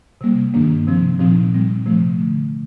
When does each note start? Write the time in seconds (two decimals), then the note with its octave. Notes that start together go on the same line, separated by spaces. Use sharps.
0.21 C3 G3 A#3
0.54 G2 D#3 A#3 D4
0.87 C3 F3 C4
1.20 A#2 F3 C4 D#4
1.53 A#2 G3 C4
1.86 C3 F3 A3
2.19 D3